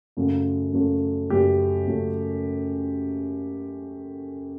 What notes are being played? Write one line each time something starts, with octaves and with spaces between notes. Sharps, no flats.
F#2 C#3 F#3 A3
F#2 C#3 F#3 A3
F#2 C#3 F#3 A3 G4
F#2 C#3 F#3 A3